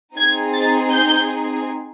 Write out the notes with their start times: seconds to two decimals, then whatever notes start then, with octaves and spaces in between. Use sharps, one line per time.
0.16 C4 D#4 G#4 G#6
0.54 A6
0.92 G6